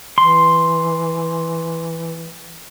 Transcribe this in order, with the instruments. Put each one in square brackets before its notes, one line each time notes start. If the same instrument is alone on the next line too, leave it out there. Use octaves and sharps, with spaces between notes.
[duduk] E3 [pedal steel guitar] C6